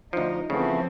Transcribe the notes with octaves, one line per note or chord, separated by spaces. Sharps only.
D2 F3 D#4
C#3 E3 F3 A3 B3 C4